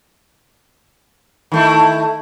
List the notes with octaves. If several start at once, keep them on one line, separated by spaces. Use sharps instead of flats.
D#3 A3 E4